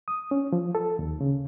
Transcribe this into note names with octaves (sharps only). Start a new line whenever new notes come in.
D#6
C#4
F3
A4
D#2
C#3